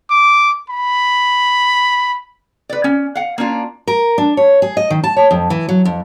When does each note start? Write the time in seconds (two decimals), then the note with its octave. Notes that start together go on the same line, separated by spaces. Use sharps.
0.10 D6
0.70 B5
2.69 B4 D5
2.84 C#4
3.15 F5 F#5
3.38 A#3 C#4 D4 F4
3.87 A#4
4.18 D4
4.37 C#5
4.62 G#4
4.77 D#5
4.90 D#3
5.04 A5
5.16 C#5
5.31 F2
5.50 E3
5.69 F#3
5.85 F2